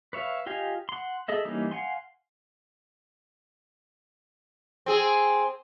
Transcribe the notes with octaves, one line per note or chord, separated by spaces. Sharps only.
B4 C#5 E5 F5
F4 G4 D#5 F5 G#5
F#5 C6
G#4 A4 D#5 E5
E3 G3 A#3 C#4 D#4
F5 F#5 G#5 C6
C4 G#4